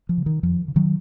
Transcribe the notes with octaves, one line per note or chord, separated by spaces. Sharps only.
F3
C#3
D#3
F2 F3
C#3
D#3 F#3